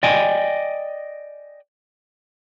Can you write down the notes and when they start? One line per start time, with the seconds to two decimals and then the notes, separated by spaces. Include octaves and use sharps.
0.03 D5 D#5 G5 G#5